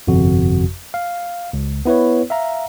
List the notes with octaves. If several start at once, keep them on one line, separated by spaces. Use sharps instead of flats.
G1 F2 C3 F#4
F5
C#2
B3 E4 B4 C#5
E5 F5 A#5